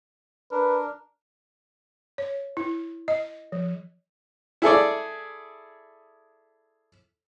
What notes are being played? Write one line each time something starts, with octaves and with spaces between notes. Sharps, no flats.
D4 A#4 B4
C#5
E4
D#5
F3
E4 G#4 A4 D5